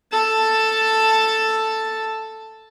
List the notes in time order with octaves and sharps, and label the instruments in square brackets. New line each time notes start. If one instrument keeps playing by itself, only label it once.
[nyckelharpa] A4 A5